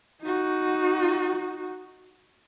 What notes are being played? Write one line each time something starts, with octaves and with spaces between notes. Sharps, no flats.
D#4 F#4